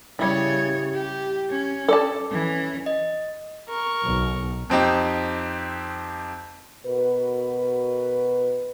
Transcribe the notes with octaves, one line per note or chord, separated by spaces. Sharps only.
C#3 G3 E4 C#5
G4
C#4
A4 D5 A5
E3 C#4
D#5
A#4 C#6
B1
F2 C4 D#4 G4
B2 F#4 A#4 B4